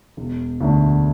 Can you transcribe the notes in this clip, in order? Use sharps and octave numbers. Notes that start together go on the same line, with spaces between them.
E1
D2 D3 A3 D4